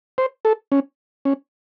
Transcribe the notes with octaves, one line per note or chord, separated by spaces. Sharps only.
C5
A4
C#4
C#4